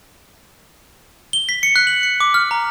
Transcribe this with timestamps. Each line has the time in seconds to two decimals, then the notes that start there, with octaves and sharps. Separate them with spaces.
1.33 G7
1.49 B6
1.63 C#7
1.76 F#6
1.87 F#7
2.03 C#7
2.20 D6
2.34 F6
2.51 A#5